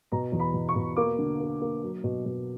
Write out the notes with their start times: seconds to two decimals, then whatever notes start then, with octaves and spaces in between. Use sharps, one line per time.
0.12 B2 A#5
0.32 E2
0.39 B5
0.54 B2
0.69 C#6
0.76 B2
0.96 A#3 D6
1.18 D3
1.40 A#3
1.61 A#3
1.83 F#3
2.04 B2
2.26 B2